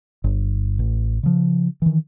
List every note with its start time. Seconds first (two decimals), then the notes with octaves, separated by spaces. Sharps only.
0.24 G1
0.79 A1
1.23 C#3 F3
1.82 D#3 E3